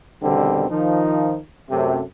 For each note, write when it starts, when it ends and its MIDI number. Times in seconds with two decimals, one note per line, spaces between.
0.23 0.70 40
0.23 0.70 47
0.23 0.70 50
0.23 0.70 51
0.23 0.70 55
0.23 0.70 60
0.70 1.39 51
0.70 1.39 53
0.70 1.39 63
1.71 2.02 42
1.71 2.02 48
1.71 2.02 57